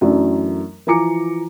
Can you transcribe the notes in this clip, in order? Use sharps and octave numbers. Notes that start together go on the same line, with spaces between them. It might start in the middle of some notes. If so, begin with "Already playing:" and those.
F#2 E3 F#3 A3 D4
E3 F3 G#5 A#5 D6 C#7